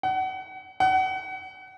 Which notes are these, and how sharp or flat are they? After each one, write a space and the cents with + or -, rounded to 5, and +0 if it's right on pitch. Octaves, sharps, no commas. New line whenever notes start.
F#5 +30
F#5 +30